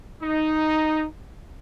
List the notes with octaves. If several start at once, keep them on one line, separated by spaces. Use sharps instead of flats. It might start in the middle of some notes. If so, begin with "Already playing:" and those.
D#4